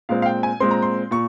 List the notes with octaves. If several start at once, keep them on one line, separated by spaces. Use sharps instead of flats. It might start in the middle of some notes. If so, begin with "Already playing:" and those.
A#2 G#3 C4 F5
F5
G5
G#5
A#2 G#3 C4 C6
A#5
C6
A#2 C#6